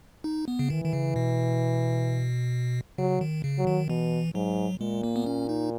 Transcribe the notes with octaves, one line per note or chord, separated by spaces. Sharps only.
D#4
B3
C#3
D#3 E3
D#3
C#3
B2
C#3 F#3
D#3
C#3
F#3
D#3
B2 E3
G#2 F#3
A#2 G#3
A#3
B3
C#4
D#4